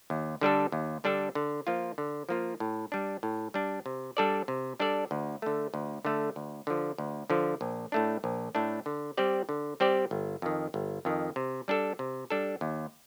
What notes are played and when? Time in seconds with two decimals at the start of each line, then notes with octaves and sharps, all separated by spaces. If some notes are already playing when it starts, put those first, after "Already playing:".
0.10 D#2
0.41 D3 G3 D4 A4
0.72 D#2
1.04 D3 G3 D4 A4
1.35 D3
1.67 F3 A#3 F4
1.98 D3
2.29 F3 A#3 F4
2.60 A2
2.92 G3 D4
3.23 A2
3.54 G3 D4
3.86 C3
4.17 G3 D4 A4 D5
4.48 C3
4.80 G3 D4 A4 D5
5.11 D2
5.42 D3 A3
5.74 D2
6.05 D3 A3
6.36 D2
6.67 D3 F3
6.98 D2
7.30 D3 F3
7.61 A#1
7.92 A2 A3 D4
8.24 A#1
8.55 A2 A3 D4
8.86 D3
9.17 G3 C4 G4 D5
9.49 D3
9.80 G3 C4 G4 D5
10.11 G1
10.42 F2 D#3
10.74 G1
11.05 F2 D#3
11.36 C3
11.68 G3 D4 A4
11.99 C3
12.30 G3 D4 A4
12.61 D#2